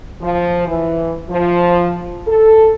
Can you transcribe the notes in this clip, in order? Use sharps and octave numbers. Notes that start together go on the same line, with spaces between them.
F3
E3
F3
A4